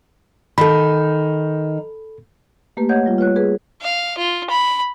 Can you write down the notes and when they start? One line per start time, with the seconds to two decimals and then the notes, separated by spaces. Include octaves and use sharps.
0.58 D#3 D#4 A4 B5
2.77 A3 A#3 G4 B4
2.89 C#5 D#5 F#5 G6 G#6
3.06 G3 F4
3.18 F4 B4 C#5 F#6
3.36 G#4 B4
3.81 F5
4.17 F4
4.50 B5